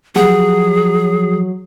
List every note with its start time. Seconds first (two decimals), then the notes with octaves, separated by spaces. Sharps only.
0.16 F3 F#3 G4 G#4 F#5